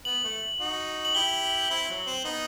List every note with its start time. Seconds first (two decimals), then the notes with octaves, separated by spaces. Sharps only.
0.05 B3 F#7
0.24 A3
0.60 D#4 F#4
1.05 F#7
1.15 E4 G4 G7
1.70 C4 E4
1.89 F#3
2.07 C4
2.24 B3 D#4